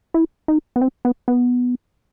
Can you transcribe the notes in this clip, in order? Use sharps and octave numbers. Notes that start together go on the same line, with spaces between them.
E4
D#4
B3
C4
B3
B3